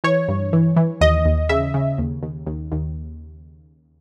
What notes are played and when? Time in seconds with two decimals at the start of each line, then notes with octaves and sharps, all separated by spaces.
0.04 E3 C#5
0.28 G2
0.53 E3
0.76 E3
1.01 D#2 D#5
1.25 D#2
1.49 C#3 E5
1.74 C#3
1.98 D#2
2.23 D#2
2.47 D#2
2.72 D#2